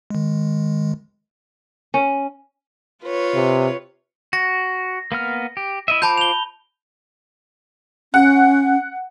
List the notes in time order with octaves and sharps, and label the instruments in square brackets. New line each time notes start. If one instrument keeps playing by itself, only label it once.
[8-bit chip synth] D#3 G#3
[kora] C#4
[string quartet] F4 B4 C#5
[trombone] C3
[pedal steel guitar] F#4 [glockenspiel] A#6
[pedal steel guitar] A#3 B3 F6
G4
E4 D#5 E5
[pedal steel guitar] F4 C5 D6 [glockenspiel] A5 B5 G6
[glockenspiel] F7 G7
[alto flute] C#4 [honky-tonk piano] F#5